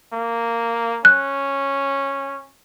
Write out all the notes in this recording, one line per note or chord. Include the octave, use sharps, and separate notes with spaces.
A#3
C#4 F#6